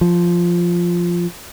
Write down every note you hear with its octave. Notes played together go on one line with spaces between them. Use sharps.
F3